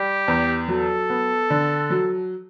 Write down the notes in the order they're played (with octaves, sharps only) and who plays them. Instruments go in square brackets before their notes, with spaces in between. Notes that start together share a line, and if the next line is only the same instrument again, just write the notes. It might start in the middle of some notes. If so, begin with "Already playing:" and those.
Already playing: [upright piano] G3 [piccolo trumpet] G4
[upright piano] E2
[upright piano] F#3 [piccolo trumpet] A4
[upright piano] B3
D3
F#3